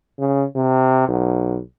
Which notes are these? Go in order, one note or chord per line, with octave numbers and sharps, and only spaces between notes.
C#3
C3
B1